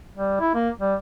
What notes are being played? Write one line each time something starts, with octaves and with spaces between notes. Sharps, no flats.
G3
E4
A#3
G3